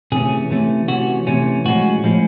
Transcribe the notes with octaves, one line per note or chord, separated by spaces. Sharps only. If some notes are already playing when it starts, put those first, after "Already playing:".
C3 E3 A3 C#4 G#4
C3 E3 A3 C#4
C3 E3 A3 C#4 F#4
C3 E3 A3 C#4
A2 F3 G#3 C#4 F#4
A2 F3 G#3 C#4